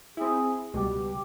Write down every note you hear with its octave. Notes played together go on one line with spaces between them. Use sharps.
C4 E4 G#4
C#2 B2 G3 G4